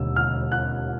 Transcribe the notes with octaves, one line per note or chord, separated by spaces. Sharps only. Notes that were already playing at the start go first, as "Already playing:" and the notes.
Already playing: E1 D#2 D3 E6
F6
F#6